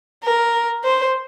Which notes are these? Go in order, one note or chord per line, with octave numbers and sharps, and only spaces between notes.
A#4
C5